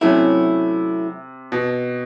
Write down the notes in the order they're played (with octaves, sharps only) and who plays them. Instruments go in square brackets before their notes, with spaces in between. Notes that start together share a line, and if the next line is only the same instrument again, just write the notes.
[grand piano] C3 [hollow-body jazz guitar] F#3 A3 C#4 E4
[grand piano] B2